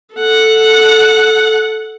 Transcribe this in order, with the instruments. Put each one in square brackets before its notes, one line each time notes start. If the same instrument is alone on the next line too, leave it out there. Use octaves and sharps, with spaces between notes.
[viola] A4 F#5